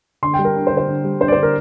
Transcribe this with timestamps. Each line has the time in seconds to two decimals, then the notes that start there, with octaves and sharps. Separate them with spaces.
0.22 D3 C6
0.34 G3 G5
0.45 A#4
0.55 D4
0.67 C5
0.71 D3
0.77 C5
0.88 D3
1.04 G3
1.20 D4 C5
1.28 D5
1.32 D3 C5
1.43 A#4